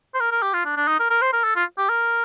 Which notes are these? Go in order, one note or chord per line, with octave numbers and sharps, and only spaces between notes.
C5
A#4
A#4
G4
F4
D4
D4
D#4
A#4
A#4
C5
A#4
A4
F4
G4
A#4